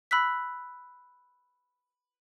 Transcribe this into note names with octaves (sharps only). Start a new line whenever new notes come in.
B5 E6 F#6 B6